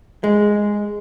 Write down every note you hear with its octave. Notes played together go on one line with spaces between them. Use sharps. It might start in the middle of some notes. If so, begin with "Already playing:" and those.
G#3